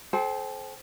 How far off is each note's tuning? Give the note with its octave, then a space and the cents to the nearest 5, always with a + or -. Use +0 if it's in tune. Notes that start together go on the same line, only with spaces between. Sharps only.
A4 -40 C5 +0 G5 +0